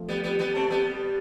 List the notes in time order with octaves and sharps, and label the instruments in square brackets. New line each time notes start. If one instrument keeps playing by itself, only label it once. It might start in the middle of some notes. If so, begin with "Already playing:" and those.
Already playing: [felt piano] F3 A3 C4 F4
[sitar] G3 B3
G3 B3
G3 B3
A3 C4
G3 B3